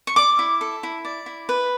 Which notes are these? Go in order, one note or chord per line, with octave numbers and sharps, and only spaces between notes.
C#6
D5 D6
E4
A4
E4
D5
E4
B4